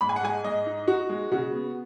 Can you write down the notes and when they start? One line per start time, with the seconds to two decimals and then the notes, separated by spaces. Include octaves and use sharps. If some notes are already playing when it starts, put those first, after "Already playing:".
0.01 G#2 B5
0.09 G#5
0.16 F#5
0.23 G#3 G#5
0.44 G#2 D#5
0.66 D#4
0.88 D#4 F#4
1.09 G#3
1.31 C#3 F#4
1.52 B3